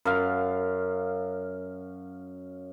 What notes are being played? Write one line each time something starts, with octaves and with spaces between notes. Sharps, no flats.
F#2 F5